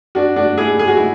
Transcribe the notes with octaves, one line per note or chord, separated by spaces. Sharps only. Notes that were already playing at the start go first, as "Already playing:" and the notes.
D4 F#4
D4 F#4
E4 G#4
G#4
F#4
E4